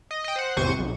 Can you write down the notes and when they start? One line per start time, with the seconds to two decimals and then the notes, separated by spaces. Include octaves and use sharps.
0.11 D#5
0.24 D#5 G5
0.36 C5 F#5
0.56 G#1 E2 C3 C5 C#6 D#7
0.79 B1